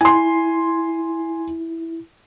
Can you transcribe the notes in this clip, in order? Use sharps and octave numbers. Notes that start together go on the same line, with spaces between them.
E4 G#5 C6